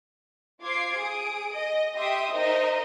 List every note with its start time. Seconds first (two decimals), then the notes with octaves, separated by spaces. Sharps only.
0.63 F4 C5 D6 G#6 C7
0.98 G#4 D#6 D7
1.57 D#5
1.96 G4 E5 C6 D#6
2.33 D#4 A#4 C5 D#5 E5